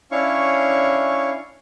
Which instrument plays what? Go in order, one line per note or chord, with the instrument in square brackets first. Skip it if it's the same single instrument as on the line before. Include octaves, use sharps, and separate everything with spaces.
[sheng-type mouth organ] C#4 D4 E4 C#5 F5 C#6